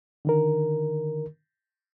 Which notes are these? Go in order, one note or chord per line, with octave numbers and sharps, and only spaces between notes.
D3 D#3 A#4